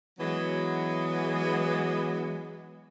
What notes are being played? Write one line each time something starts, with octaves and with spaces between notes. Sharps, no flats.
E3 F#3 G#3 B3